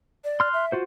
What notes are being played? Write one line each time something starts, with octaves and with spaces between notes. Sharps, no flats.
D5
C6 F6 F#6
E5
F4 F#4 C5